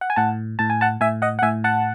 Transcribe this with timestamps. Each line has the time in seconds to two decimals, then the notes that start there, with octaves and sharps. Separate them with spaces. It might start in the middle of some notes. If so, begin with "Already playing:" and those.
0.01 F#5
0.10 G#5
0.16 A2 F#5 A5
0.59 A2 A5
0.70 G#5
0.81 F#5 A5
1.01 A2 E5 G#5
1.22 D#5 F#5
1.39 F#5
1.42 A2 E5 G#5
1.64 F#5 A5